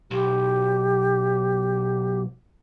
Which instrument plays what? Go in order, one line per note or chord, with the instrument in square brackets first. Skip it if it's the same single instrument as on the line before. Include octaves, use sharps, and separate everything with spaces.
[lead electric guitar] B1 [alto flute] G4